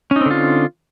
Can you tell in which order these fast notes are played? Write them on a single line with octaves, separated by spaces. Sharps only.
C#4 D#4 C4 D3 F4